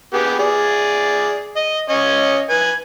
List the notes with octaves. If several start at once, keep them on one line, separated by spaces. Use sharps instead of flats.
B3 G4 G#4
G#4 D5
D#5
C#4 C#5 D#5
B4 G#5